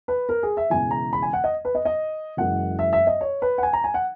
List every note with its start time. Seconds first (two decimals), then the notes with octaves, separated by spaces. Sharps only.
0.08 B4
0.29 A#4
0.43 G#4
0.57 E5
0.70 E1 E2 C#3 E3 G#5
0.91 A#5
1.13 B5
1.22 G#5
1.33 F#5
1.44 D#5
1.65 B4
1.75 D#5
1.85 D#5
2.37 F#1 F#2 E3 G#3 F#5
2.79 E5
2.93 E5
3.07 D#5
3.21 C#5
3.42 B4
3.58 F#5
3.63 G#5
3.73 A#5
3.84 G#5
3.94 F#5